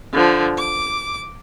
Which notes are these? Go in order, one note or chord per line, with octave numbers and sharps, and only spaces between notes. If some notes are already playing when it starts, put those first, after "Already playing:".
D3 F3
D6